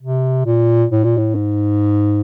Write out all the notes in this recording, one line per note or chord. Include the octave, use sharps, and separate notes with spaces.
C3
A#2
A2
A#2
A2
G#2